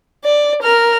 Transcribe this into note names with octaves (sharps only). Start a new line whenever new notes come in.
D5
A#4 F6